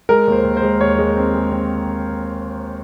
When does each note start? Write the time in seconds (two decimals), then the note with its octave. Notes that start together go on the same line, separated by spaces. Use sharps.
0.09 G#3 A#4
0.27 D#2 C5
0.44 D#2
0.57 C5
0.62 G#3
0.80 D#2 C#5
0.98 G#3
1.17 C4
1.34 G#3
1.52 C4